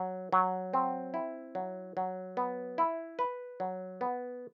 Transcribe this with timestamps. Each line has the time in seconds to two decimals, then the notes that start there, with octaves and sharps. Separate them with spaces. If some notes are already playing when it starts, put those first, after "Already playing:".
Already playing: F#3
0.33 F#3
0.74 C4
1.14 E4
1.55 F#3
1.97 F#3
2.37 B3
2.78 E4
3.19 B4
3.60 F#3
4.01 B3